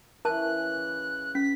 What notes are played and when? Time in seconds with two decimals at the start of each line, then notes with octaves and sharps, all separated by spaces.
0.25 C#3 E3 A#4 A5 F#6
1.35 C#4 B6